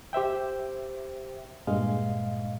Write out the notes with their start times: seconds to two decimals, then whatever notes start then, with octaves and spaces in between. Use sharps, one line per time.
0.13 G4 C5 E5 G5
1.67 G2 A#2 G#3 D#5 F5